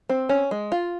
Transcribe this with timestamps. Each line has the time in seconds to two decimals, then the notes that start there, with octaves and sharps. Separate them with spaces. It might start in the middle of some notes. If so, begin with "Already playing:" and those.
0.09 C4
0.29 C#4
0.51 G#3
0.72 F4